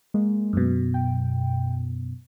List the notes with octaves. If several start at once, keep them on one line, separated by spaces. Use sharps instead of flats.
G#3 A#3
F#2 B2
G5